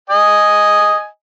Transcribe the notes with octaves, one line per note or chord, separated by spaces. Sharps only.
D#5 G#5